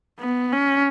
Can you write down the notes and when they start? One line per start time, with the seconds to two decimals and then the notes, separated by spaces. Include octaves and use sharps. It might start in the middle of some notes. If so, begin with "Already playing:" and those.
0.20 B3
0.52 C#4